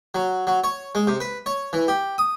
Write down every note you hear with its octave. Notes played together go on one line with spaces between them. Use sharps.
F#3
F#3
C#5
G#3
C3
B4
C#5
E3
G4
D#6